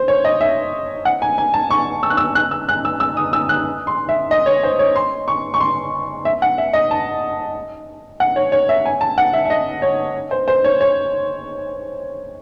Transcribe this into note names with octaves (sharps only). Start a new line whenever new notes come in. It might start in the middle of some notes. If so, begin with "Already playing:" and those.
Already playing: C5
C#5
D#5
E5
F#5
G#5
G#5
A5
C#6
E6
F#6
E6
F#6
E6
F#6
E6
E6
D#6
E6
F#6
C6
E5
D#5
C#5
C5
C#5
C6
C#6
C#6
C6
E5
F#5
E5
D#5
A5
F#5
C#5
C#5
E5
G#5
A5
F#5
E5
E5
D#5
C#5
C5
C5
C#5
C#5